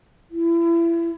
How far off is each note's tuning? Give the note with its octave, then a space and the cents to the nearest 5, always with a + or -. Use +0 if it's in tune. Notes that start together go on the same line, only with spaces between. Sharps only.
E4 +30